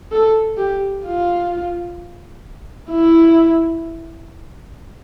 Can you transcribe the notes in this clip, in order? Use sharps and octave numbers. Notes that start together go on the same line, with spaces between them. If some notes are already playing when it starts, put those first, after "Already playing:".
A4
G4
F4
E4